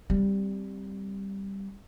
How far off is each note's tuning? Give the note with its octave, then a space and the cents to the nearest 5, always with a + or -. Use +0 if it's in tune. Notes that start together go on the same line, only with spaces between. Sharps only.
G3 +0 C4 +0